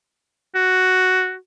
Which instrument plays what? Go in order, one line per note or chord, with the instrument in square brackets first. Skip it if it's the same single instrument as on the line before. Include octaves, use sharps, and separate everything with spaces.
[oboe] F#4